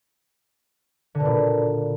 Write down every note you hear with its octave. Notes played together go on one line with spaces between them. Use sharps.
D3
B2
A#2